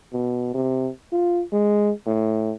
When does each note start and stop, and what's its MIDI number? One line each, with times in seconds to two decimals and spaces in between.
0.13 0.50 47
0.55 0.90 48
1.13 1.44 65
1.53 1.92 56
2.07 2.53 45